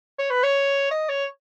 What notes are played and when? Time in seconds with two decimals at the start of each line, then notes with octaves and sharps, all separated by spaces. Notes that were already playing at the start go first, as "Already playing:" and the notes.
0.19 C#5
0.30 B4
0.43 C#5
0.91 D#5
1.09 C#5